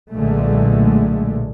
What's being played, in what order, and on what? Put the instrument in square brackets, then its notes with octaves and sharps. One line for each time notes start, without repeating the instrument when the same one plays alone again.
[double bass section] B1 A#2 D3 G#3 A3